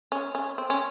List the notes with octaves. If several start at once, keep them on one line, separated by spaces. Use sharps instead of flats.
C#4
C#4
C4
C#4